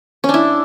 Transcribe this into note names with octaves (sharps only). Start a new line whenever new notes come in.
C#4
D4
E4